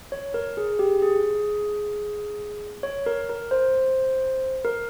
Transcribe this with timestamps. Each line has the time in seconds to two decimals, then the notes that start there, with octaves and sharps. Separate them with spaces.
0.12 C#5
0.34 A#4
0.57 G#4
0.79 G4
1.02 G#4
2.83 C#5
3.06 A#4
3.29 A#4
3.51 C5
4.65 A#4